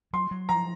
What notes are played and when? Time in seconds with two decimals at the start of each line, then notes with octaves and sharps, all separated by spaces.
0.13 F#3 C6
0.31 F#3
0.49 F3 A#5